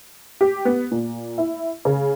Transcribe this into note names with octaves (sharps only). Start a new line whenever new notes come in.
G4
B3
A#2
E4
C#3